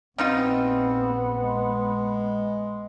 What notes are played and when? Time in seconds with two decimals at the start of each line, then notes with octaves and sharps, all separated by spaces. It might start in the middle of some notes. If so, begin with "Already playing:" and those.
0.18 A#1 G3 B3 C4 D#4 F4
1.42 G#3